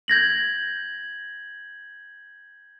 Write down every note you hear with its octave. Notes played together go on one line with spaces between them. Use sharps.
G6 G#6 A#6 F#7